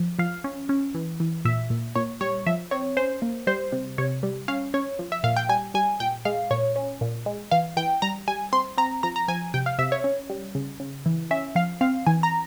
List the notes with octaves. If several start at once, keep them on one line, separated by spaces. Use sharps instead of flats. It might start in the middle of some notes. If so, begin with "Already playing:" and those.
Already playing: F3
F3 F5
C#4
C#4
E3
E3
A#2 E5
A#2
A#2 C#5
G3 C#5
F3 E5
C4 C#5
C#4 C5
A#3
G3 C5
C3
C3 C#5
G3
C#4 F5
C#4 C#5
F3
E5
A#2 F5
G5
G3 G#5
G3 G#5
A#2 G5
G#3 F5
A#2 C#5
C#4
A#2
G#3
E3 F5
E3 G5
G3 A#5
G3 G#5
C4 C6
C4 A#5
F3 A#5
A#5
F3 G#5
C3 G5
F5
C3 E5
C#5
C#4
G3
C#3
C#3
E3
C#4 E5
F3 F5
C4 F5
E3 G#5
A#5